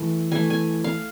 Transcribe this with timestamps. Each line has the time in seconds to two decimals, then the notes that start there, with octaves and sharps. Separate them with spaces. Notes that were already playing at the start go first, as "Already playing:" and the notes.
Already playing: E3 A3
0.32 E3 A3 G#5
0.50 G#5
0.84 F5